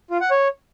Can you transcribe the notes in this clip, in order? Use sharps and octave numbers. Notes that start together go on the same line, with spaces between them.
F4
F#5
C#5